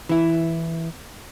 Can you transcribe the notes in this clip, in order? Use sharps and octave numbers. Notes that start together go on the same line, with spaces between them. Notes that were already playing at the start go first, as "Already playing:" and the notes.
E3 E4